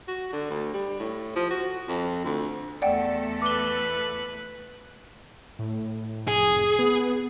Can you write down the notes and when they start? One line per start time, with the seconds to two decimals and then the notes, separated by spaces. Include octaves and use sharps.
0.08 F#4
0.33 D3
0.50 D2
0.74 G3
1.00 A2
1.36 F3
1.50 F#4
1.88 F2
2.24 D2
2.82 E2 A3 A4 D5 F#5 G5
3.42 B4 D6 G7
5.59 A2
6.28 F1 G#4
6.79 B3